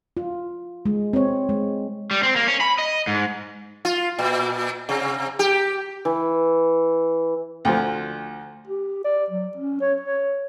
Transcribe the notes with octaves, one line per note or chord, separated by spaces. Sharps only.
F4
G#3
C4 C#5
G#3
G3
C4
A#3
C#4
B5
D#5
G#2
F4
A#2
C3
G4
E3
D2 F3
G4
D5
F#3
C#4
C#5
C#5